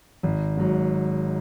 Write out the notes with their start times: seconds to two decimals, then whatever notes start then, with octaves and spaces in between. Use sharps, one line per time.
0.23 G#1
0.57 G#2 F#3